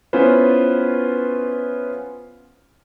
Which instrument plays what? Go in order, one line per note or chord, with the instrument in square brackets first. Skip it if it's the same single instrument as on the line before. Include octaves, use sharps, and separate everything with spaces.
[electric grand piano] B3 C#4 E4 F4 B4 C5